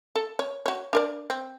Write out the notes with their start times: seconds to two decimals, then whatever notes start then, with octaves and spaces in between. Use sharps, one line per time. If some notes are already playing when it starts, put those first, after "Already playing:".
0.15 A4
0.39 C#5
0.66 F#4 C#5
0.93 D4 A#4 D5
1.30 C4